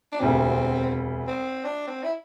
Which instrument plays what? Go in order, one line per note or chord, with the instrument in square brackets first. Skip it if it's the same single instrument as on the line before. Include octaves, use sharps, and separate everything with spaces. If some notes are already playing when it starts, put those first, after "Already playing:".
[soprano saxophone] D4
[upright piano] E1 D2 C3 [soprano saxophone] C4
[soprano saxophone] C4
D4
C4
E4